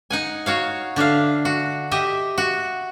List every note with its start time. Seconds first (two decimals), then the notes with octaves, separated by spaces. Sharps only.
0.10 D#4 F#5 G#5
0.46 F#4 C#5 F5
0.96 D3 D4 E5 F5
1.45 F#4
1.91 G4 D#5 E5
2.38 F#4